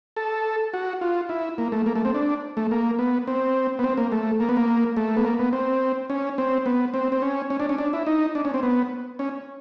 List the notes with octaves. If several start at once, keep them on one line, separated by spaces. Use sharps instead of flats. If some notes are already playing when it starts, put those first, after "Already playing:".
A4
F#4
F4
E4
A#3
A3
A#3
A3
C4
D4
A3
A#3
B3
C4
B3
C4
A#3
A3
A#3
B3
A#3
A3
B3
A#3
B3
C4
C#4
C4
B3
C4
C4
C#4
C#4
D4
C#4
D4
E4
D#4
D4
C#4
C4
B3
C#4